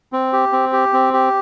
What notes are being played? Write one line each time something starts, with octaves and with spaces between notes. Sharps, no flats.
C4
G4
C4
G4
C4
G4